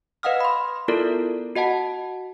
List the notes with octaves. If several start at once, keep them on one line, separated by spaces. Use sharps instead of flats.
B4 D#5 F5 F#5 D#6 F6
B5 C6
B3 E4 F4 A4 A#4 D5
F#4 D#5 F#5 A5